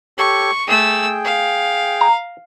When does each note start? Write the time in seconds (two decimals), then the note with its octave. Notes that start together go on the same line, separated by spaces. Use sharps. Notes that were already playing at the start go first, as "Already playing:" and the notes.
0.18 G4 A4 C#5 C#6
0.68 A3 G#4 G5 E6
1.25 F5
2.01 A#5